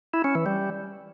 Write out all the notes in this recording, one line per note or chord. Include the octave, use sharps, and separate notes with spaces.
E4
C#4
E3
G3